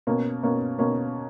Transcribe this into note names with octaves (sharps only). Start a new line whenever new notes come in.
B2 A#3 C#4
B2 A#3 C#4
B2 A#3 C#4